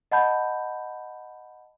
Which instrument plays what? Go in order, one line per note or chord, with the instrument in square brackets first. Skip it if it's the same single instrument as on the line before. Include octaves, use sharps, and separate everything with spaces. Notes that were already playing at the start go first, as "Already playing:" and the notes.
[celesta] D#5 F#5 A5 B5 G6